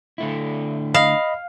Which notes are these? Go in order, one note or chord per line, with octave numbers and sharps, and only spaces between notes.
D3 A3 E4
D#5 F5 B5